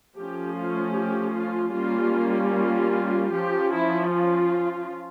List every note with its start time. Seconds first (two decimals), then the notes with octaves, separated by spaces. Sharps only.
0.16 F3 A3 C#4 G4
0.56 F4
0.96 G4
1.35 F4
1.74 G3 A#3 C#4 F4
2.54 F4
3.32 F3 C#4 G4
3.72 E4
4.12 F4